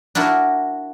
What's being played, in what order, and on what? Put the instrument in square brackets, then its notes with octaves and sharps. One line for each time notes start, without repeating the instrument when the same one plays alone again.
[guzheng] D4 E4 F#4 A#4